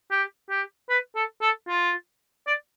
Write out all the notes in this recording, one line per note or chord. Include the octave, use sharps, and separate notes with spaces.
G4
G4
B4
A4
A4
F4
D5